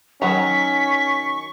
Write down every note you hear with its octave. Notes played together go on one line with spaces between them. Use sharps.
D#3 F#3 C#4 A#5 C#6 B6